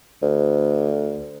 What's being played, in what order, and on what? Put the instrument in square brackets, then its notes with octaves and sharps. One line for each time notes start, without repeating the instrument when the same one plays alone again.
[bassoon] D2